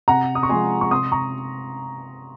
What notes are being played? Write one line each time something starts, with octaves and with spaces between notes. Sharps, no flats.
C3 F#5 A#5
D#6
C#6
F3 G#3 G#5 C6
C#6
C3 C6 D#6
A#5 C#6